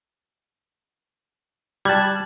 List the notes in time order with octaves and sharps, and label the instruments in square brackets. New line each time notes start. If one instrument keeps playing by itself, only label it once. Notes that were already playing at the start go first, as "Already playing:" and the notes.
[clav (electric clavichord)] G3 [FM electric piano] A5 F#6 G#6